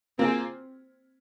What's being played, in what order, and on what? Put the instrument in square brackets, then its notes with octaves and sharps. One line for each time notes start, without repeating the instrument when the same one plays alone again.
[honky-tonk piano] A#3 F4 G#4 [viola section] C4